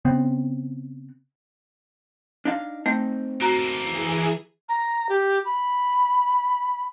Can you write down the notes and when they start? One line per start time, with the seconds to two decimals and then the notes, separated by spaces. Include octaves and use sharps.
0.05 C#3 B3 C4
2.45 D4 D#4 F5
2.86 A3 C4 D#4
3.41 A#3 F#4 A4 A#5
3.81 E3 G#4
4.69 A#5
5.09 G4
5.45 B5